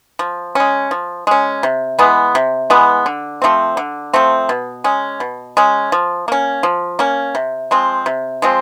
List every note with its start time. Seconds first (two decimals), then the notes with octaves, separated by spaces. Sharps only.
0.19 F3
0.55 G#3 C#4
0.91 F3
1.27 G#3 C#4
1.63 C3
1.99 E3 G#3 B3
2.35 C3
2.70 E3 G#3 B3
3.06 D3
3.42 F3 A3 C4
3.77 D3
4.13 F3 A3 C4
4.49 B2
4.84 G#3 C#4
5.20 B2
5.57 G#3 C#4
5.92 F3
6.28 A#3 C#4
6.63 F3
6.99 A#3 C#4
7.35 C3
7.71 F3 G#3 C4
8.06 C3
8.42 F3 G#3 C4